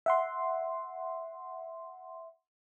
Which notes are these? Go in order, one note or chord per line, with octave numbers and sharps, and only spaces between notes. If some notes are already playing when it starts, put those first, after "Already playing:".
E5 F#5 C6